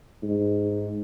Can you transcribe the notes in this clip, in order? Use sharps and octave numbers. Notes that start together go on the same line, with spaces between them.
G#2